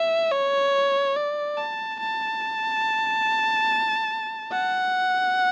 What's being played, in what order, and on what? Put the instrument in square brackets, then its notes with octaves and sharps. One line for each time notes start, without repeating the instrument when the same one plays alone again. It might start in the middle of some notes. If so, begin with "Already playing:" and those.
Already playing: [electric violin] E5
C#5
D5
A5
A5
F#5